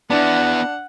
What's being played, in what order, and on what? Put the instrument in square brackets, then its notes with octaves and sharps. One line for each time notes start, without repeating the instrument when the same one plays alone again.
[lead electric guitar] B3 E4 [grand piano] D4 [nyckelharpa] F#5